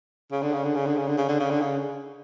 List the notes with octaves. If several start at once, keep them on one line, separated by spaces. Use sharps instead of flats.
C#3
D3
C#3
D3
C#3
D3
C#3
D3
C#3
D3
C#3
D3
C#3